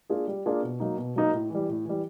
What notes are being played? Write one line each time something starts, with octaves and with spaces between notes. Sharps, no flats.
A#3 D4 F4 G#4
G3
A#3 D4 F4 G#4
B2
F#3 A#3 D#4
B2
F#3 A#3 D#4
A2
E3 G3
A2
E3 G3